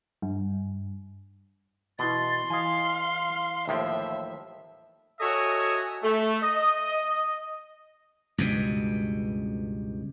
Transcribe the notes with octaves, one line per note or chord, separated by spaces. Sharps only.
G2
B2 E3 E4 C6 A6
E3 D#5 F5 G#5
D#2 A2 F3 E5
F#4 A4 C#5 D#5 E5 G#5
A3
D#5
C#2 G2 B2